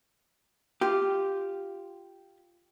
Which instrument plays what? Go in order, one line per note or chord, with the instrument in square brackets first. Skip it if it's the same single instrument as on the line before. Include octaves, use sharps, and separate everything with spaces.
[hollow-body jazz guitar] F4 G4